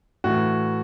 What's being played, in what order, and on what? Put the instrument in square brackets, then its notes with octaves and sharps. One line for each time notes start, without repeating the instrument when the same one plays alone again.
[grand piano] A2 E3 F#4